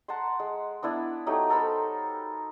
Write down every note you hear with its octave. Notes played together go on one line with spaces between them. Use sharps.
F#5 A5 A#5 C6
G#3
B3 D4 E4 D5
F#3 A3 D#4 G4
A4 A#4 C5 B5